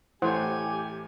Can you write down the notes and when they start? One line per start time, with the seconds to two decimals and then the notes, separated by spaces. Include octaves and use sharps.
0.22 A1 A3 E4 G4 C5 F#5 G#5